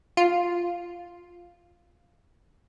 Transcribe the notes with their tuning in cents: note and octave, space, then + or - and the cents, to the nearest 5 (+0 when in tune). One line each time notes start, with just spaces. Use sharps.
F4 +0